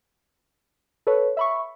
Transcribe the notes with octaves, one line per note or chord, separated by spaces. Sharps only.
A4 B4 C#5
E5 B5 C#6